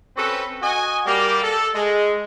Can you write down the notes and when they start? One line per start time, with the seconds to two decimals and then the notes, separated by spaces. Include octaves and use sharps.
0.17 C4 C#4 F#4 A4 B4
0.62 F#4 D#5 G#5
1.06 G3 A#3 G4
1.43 A4
1.75 G#3